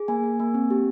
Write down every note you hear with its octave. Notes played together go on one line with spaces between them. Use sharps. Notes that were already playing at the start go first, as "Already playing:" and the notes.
Already playing: G#4
A#3 G#5
A#3
A#3
C4
G4